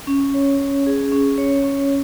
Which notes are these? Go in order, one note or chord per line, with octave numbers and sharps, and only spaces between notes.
C#4
C#5
C#4
G#4
C#4
C#5
C#4